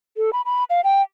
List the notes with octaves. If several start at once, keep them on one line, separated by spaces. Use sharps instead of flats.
A4
B5
B5
F5
G5